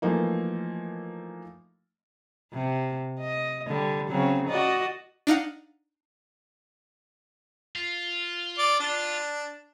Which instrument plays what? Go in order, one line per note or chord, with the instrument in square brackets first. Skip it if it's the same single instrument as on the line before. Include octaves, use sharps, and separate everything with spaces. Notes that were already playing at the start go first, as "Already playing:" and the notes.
[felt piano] E3 F3 A3 A#3 D#4
[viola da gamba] C3
D#5
D3 G3
C#3 F#3 C4
F#4 D5 D#5
[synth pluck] D4 D#4 F5 F#5
[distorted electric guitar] F4
[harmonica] D5
D4